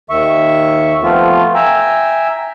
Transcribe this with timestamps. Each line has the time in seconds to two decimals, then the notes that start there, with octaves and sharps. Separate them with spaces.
0.10 D#2 D#3 E5 C#6
1.03 F3 A3 B3 C4 F4
1.55 E5 G5 G#5 A#5 E6